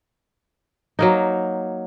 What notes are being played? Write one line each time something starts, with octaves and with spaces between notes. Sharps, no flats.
F#3 A#3 D#4